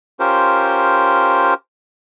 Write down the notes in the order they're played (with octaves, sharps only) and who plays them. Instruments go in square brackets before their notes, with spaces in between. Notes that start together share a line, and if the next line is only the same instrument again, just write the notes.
[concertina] C#4 F4 G4 A#4 C5